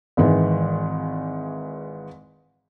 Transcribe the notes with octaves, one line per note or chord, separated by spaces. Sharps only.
G#1 G#2 D#3 E3